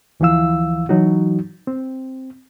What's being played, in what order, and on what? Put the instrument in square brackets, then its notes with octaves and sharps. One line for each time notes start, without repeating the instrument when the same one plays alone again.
[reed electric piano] D2 E3 F3 E4 F5 E6
E3 F#3 D#4 F#4
C4